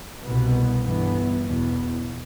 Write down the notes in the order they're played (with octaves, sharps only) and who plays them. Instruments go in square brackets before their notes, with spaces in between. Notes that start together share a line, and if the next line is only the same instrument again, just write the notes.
[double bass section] C2 B2 B3
G1 G2 E3 B3
E2 B2 B3